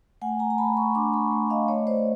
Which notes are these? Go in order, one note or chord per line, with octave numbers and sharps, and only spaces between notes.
A3 F#5 G#5
G#5 A#5
A#5
A3 A5 B5
B5 C#6
D4 C6 D6
B5 C#6
A3
D#5 F5
A3 C#5 D#5
C5 D5